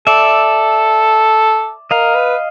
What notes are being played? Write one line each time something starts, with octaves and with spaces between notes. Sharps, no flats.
A4 D5 E5
A#4 D#5 F5
B4